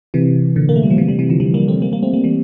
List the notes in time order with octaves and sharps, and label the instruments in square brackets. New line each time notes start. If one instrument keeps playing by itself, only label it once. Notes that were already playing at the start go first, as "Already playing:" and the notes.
[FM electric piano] C3 E3
A#2 D3
A#3
A3
G3
F3
C3 E3
E3 G3
C3 E3
D3 F3
E3 G3
G3 A#3
A3 C4
G3 A#3
G3 A#3
A3 C4
G3 A#3
E3 G3